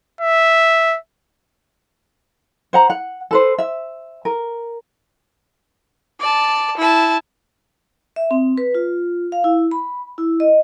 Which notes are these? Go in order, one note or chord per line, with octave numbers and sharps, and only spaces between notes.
E5
C5 F#5 A#5
F#5
A4 B4 C5
E5
A#4
D5 A5
E4 A5
E5
C4
B4
F4
F5
E4
B5
E4
D#5